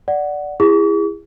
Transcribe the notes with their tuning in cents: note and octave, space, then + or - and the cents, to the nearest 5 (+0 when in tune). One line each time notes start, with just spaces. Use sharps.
D5 +0 F#5 +0
E4 +20 G#4 -30 C#6 +45